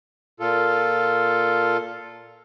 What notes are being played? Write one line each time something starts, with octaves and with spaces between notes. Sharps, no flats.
A#2 F4 A4